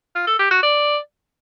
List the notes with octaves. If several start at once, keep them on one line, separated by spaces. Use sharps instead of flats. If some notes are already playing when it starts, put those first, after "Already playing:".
F4
A4
G4
F#4
D5